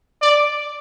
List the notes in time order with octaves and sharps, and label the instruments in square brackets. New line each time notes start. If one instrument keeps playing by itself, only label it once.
[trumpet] D5